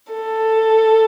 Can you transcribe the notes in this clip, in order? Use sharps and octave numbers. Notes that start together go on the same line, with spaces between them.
A4